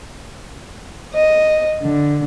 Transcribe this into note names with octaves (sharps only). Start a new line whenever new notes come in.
D#5
D3